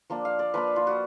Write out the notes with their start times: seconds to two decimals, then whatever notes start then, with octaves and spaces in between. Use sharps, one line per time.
0.10 F3 A#3 D4
0.25 F5
0.39 D5
0.54 F3 A#3 D4 B4
0.76 F4
0.87 F#4